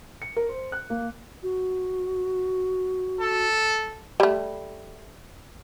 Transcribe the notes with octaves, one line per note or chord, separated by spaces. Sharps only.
C#7
A#4
C5
F#6
A#3
F#4
A4
G3 A3